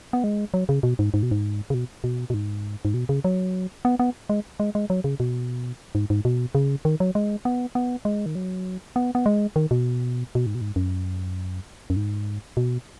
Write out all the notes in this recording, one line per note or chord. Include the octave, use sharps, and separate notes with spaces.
B3
G#3
F#3
C#3
B2
G#2
G#2
B2
G#2
C#3
B2
B2
B2
G#2
G#2
B2
C#3
F#3
B3
B3
G#3
G#3
G#3
F#3
C#3
B2
G#2
G#2
B2
C#3
D#3
F#3
G#3
B3
B3
G#3
D#3
F#3
B3
B3
G#3
D#3
B2
B2
G#2
B2
G#2
F#2
F#2
G#2
B2